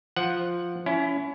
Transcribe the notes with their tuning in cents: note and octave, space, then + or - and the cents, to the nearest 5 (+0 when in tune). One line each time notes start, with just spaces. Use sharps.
F3 +0 F#5 +0
C#4 +25 E4 +20